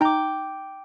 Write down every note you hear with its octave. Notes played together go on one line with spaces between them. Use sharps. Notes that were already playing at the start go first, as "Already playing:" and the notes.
D#4 G5 A#5 D6